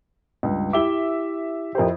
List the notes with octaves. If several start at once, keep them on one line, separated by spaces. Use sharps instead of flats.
C#2 G2
E4 G4 E5 D6 G7
F2 E4 G4 A#4 C5